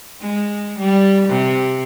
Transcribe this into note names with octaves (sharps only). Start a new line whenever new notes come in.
G#3
G3
C3